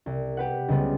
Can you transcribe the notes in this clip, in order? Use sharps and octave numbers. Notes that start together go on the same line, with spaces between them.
C2
G4 B4 F#5
C#2 C#3 F#3 G3 B3